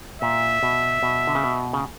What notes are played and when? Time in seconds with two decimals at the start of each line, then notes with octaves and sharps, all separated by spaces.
0.22 A#2 E5
0.63 B2
1.03 B2
1.27 D3
1.35 C#3
1.44 B2
1.73 C#3